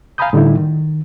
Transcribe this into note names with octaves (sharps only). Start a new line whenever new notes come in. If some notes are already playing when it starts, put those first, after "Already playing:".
F5 G#5 A#5 B5 D#6 G6
A2 D3 G3 D#4 E4
D#3